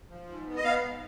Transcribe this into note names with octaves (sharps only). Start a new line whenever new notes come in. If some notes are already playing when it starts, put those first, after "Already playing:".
F3
G#2
B3
D#5
B3 F5
G#2